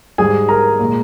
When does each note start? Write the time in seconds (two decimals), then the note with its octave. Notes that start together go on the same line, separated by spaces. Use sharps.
0.18 G#2 G3 G#4 G#5
0.49 A#4 A#5
0.79 A#2 G#3